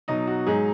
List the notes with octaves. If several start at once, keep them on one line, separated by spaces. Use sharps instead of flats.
B2 F#3 D#4 D#5
F#4
G#2 F#3 D#4 G#4